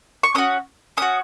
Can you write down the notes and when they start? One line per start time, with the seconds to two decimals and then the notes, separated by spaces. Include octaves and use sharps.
0.23 C#6
0.35 C#4 F#4 D#6
0.97 C#4 F#4 D#6